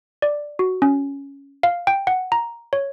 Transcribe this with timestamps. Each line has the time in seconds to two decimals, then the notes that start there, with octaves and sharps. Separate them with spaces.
0.22 D5
0.59 F#4
0.82 C#4
1.63 F5
1.87 G5
2.07 F#5
2.32 A#5
2.73 C#5